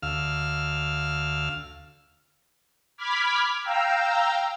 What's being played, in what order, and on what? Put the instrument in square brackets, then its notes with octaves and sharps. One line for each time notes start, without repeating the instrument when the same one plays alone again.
[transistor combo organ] D2 F5 E6 F6
[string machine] B5 D6 F6 G#6 B6
F5 G5 A#5 E6